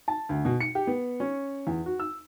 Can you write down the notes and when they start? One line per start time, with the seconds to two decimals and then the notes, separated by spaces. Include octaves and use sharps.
0.08 A5
0.29 D2
0.45 B2
0.60 C#7
0.75 G4
0.87 B3
1.20 C#4
1.67 E2
1.86 F#4
2.00 E6